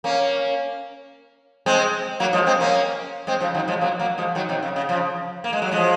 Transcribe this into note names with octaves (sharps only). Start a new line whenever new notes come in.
A#3 C#4
G#3 C4
F#3 A#3
F3 G#3
G#3 C4
A#3 C#4
G#3 C4
C#3 F3
D#3 F#3
F3 G#3
F#3 A#3
F#3 A#3
F3 G#3
D#3 F#3
C3 D#3
C#3
C#3
C#3 F3
A#3
G#3
F#3
F3 G#3